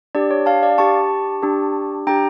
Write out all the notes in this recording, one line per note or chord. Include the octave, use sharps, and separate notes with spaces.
D4 G4 D5
C#5
F5 A5
D5 F5
D4 G4 A5 C#6
D4 G4
D4 G4 G5 A#5